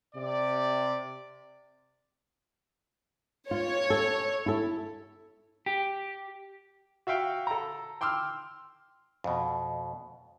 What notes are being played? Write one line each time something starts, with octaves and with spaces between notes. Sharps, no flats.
C3 D5
F4 C#5
A4
E4 A4
G4
F#4 E5 F5 G5
A4 A#5
G5 C6 D6 E6 F6
F2 B2